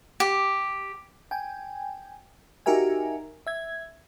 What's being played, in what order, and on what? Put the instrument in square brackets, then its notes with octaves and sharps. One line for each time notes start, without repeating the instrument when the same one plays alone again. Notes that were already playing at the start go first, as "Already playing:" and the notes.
[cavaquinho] G4
[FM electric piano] G5 G#5
D#4 F#4 G4 A#4 E5 G#5
E5 G#6